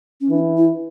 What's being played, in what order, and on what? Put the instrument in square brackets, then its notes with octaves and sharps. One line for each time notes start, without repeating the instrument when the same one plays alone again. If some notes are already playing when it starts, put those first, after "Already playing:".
[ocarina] C#4
[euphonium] E3 [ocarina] D4
[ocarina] E4